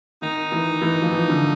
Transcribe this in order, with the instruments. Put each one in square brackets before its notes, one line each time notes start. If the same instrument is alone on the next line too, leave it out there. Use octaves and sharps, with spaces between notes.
[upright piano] D#3 [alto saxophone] D#4
[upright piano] E3
E3
F3
E3
D3